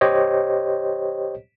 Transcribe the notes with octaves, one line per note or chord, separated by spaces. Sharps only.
G4 C5 C#5 D#5